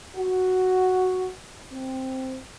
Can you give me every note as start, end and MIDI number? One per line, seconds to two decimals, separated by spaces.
0.16 1.30 66
1.71 2.39 60